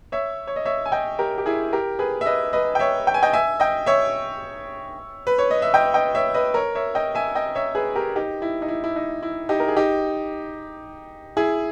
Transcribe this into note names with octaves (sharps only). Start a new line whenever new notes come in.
C#5 E5
C#5
D#5
C#5 E5
G#5
D#5 G5
G4 A#4
G4
E4 G#4
G4 A#4
G#4 B4
E5
B4 D#5
B4 D#5
G5
C#5 E5
G5
G#5
D#5 G5
E5 G#5
D#5 G5
C#5 E5
B4
C#5
D#5
E5
D#5 G5
D#5 G5
C#5 E5
B4 D#5
A#4 C#5
C#5 E5
D#5 G5
E5 G#5
D#5 G5
C#5 E5
G#4 B4
G4 A#4
D#4 G4
E4
D#4
E4
E4
D#4
E4
D#4 G4
A#4
G#4
D#4 G4
E4 G#4